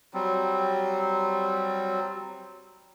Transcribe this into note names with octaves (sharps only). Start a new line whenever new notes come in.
F#3 G3 C4